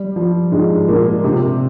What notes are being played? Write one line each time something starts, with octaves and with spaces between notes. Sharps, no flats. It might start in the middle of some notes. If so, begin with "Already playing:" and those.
Already playing: G3
F3
G#2 G#3
A#2 A#3
C3 C4